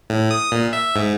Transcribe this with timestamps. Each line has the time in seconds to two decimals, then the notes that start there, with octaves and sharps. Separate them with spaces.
0.10 A2
0.31 D#6
0.52 A#2
0.73 E5
0.96 G#2